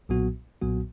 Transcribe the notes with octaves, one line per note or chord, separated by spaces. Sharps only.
B1 A#2 F#3 B3 F#4
B1 A#2 F#3 B3 F#4